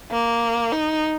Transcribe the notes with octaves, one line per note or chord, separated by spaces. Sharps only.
A#3
D#4